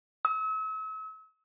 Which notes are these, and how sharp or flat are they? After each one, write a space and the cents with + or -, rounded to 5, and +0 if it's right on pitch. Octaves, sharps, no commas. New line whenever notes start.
E6 -40